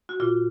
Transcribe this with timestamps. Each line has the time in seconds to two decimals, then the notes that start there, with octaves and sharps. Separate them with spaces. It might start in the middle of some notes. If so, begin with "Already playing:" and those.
0.09 F#4
0.20 A#2 F4